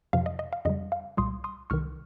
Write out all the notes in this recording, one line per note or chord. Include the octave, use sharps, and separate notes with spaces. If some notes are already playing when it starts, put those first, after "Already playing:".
F2 C3 F3 F5
D#5
D#5
F5
F2 C#3 G3 D#5
F5
C2 A#2 G3 C6 D#6
C6 D#6
C2 C3 D#3 C#6 F6